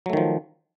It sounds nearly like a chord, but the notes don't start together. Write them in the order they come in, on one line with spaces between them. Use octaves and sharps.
F#3 A3 D#3 F3